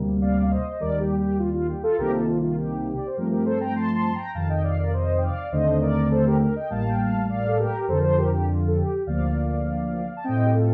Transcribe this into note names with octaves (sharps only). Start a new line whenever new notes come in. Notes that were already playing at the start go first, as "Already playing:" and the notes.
Already playing: D2 C3 G3 A#3
D5 F5
F5
C5 D#5
D#5
D#2 D#3 G3 A#3 A#4 D5
G4
G4
F4
F4
G4
F4 A4
C2 C3 D#3 A#3 G4 A#4
F4 A4
F4
F4
G4
D5
C5
G2 F3 A3 C4 G4 A#4
G4 A#4
A4 C5
G5 A#5
A5 C6
A5 C6
C6
G5 A#5
F2 C3 D#3 F5 A5
D#5 G5
D5 F5
A#4 D5
F5
C5 D#5
G5
D5 F5
D#2 D3 A3 C4 C5 D#5
A#4 D5
A4 C5
G4 A#4
G4 A#4
D#5 G5
A1 A2 G3 A#3 F5 A5
G5
F5 A5
D5 F5
A4
G4 A#4
F2 D3 F3 A4 C5
A#4
A4 C5
G4 A#4
G4
F4
A4
G4
D2 D3 F3 A#3 D5 F5
A5
A2 A3 C4 D#5 G5
G4
F4 A4